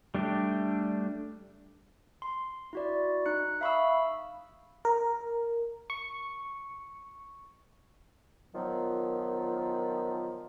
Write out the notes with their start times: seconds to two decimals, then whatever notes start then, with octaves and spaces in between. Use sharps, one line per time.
0.15 G3 A3 D4 G4
2.22 C6
2.73 E4 F#4 D5
3.26 D#4 F#6 C#7
3.61 E5 F5 B5 C#6 D#6 E6
4.85 A#4
5.90 C#6
8.55 A#2 D#3 F3 F#3 B3